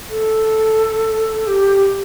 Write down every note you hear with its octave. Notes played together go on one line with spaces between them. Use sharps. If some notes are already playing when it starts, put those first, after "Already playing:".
A4
G4